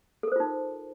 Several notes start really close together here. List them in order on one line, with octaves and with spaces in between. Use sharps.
A4 A#4 C5 F4 D#4